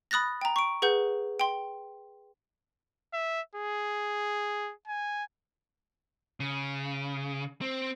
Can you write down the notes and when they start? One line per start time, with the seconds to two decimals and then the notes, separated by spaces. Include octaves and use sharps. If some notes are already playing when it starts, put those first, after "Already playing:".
0.11 B5 D#6 F#6 A6 A#6
0.41 G5 A#5
0.56 C#6 D7
0.82 G#4 B4 F#5 G6
1.40 G5 C6
3.13 E5
3.55 G#4
4.87 G#5
6.40 C#3
7.62 C4